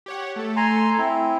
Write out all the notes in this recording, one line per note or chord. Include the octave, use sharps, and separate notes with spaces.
G4 C#5 F#5
A3 A4
G#5 A#5 C6
C4 E4